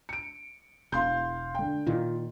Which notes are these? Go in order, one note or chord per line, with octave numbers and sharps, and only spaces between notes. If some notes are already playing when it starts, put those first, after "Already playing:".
C#7 D7
E1 F5 C6 G6
D3 G5
A#2 D#3 F4